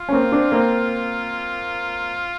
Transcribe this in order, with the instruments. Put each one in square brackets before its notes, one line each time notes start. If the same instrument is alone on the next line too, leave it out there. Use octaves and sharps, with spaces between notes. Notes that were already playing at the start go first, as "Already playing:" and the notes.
Already playing: [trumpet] F4
[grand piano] C#4
A#3 C4
C4 D4
A#3 C4